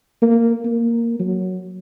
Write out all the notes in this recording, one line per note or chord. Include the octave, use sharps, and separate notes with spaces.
A#3
A#3
F#3